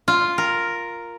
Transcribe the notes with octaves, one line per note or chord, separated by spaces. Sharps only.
F4
A#4